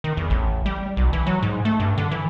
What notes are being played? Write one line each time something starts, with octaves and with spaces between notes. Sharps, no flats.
D#3
E2
A1
G3
B1
E3
F#3
G#2
A3
G2
D3
E3